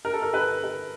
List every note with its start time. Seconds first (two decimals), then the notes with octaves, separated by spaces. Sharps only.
0.05 A#4
0.13 A4
0.22 A#4
0.34 B4
0.64 B4